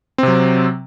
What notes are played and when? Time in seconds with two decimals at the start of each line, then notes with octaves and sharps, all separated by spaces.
0.18 C4
0.23 C3
0.28 F#3